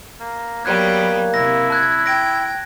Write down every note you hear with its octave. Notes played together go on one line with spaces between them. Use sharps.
A#3
F#3 G3 A#3 B3 B4 F#6 G#6
C3 E4 A#6
A5 F#6 G#6
G5 A#6 D7